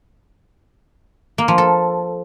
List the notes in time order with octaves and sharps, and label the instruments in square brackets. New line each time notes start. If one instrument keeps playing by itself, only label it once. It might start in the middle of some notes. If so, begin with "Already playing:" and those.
[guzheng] A#3
F3
A4